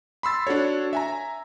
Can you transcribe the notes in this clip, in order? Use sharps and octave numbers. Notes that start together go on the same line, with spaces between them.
B5 C6 E6 A6
D4 F#4 A4 C#5
E5 G#5 A#5